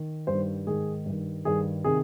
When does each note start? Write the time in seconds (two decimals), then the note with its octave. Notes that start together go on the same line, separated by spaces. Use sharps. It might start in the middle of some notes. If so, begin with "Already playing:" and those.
Already playing: D#3
0.27 G2 D#3 C5
0.67 G#2 D#3 G#4
1.06 G2 D#3
1.45 G2 D#3 G#4
1.84 C3 D#3 G#4